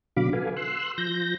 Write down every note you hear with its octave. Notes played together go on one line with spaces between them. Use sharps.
B2 D3 F#3 F5 B5 D6
F#4 A4 B4 F5 G#5
C6 E6 F#6
F3 G6 A#6